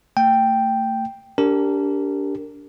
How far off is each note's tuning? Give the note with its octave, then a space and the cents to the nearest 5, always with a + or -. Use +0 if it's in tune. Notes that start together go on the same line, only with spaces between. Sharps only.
A3 +40 G5 +0
D4 -25 G4 +0 A#4 -20